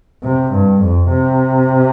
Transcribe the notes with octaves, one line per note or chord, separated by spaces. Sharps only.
C3
G2
F2
C3